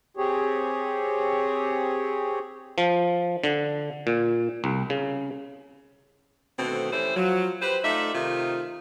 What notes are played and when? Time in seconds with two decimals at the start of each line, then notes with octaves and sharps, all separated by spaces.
0.17 C4 G4 G#4 C#5
2.78 F3
3.44 D3
4.07 A#2
4.64 C2
4.90 C#3
6.59 B2 D3 D#3 A3 C4
6.93 E3 A3 C#4 E4 G4 C5
7.17 F3 F#3
7.62 G4 B4 C5
7.85 A3 D#4 F4 D5 E5
8.15 C3 D#3 A3 D#4 F4